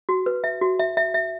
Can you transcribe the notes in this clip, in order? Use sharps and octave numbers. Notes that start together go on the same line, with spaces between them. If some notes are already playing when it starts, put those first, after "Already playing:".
F#4
B4
E5
F#4
E5
E5
E5